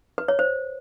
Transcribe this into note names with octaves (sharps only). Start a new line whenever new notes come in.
B4
C#5
C5